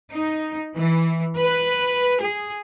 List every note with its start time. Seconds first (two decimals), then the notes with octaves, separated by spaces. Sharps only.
0.12 D#4
0.76 E3
1.39 B4
2.21 G#4